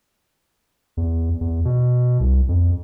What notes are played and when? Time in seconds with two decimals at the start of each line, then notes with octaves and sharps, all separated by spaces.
0.97 E2
1.41 E2
1.65 B2
2.20 C2
2.49 F2